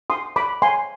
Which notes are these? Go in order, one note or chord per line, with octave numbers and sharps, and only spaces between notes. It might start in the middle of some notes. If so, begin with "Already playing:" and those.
C6 D#6
B5 D6
G#5 C6